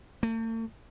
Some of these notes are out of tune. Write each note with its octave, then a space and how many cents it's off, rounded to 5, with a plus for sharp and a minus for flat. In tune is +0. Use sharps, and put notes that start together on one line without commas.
A3 +45